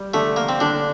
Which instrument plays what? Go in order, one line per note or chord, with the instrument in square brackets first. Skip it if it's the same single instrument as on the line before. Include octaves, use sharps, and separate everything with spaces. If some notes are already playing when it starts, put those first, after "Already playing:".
Already playing: [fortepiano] G3
[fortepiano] D3 [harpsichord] A3
[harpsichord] A#3
C4
[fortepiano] D3 [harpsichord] D4